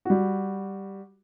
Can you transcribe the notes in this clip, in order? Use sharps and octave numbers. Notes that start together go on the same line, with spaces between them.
G3 F#4